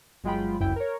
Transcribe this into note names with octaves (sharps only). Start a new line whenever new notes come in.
G1 F#3 G#3 F4 G5 B5
G1 C#2 F#2 E4 G5
A#4 C#5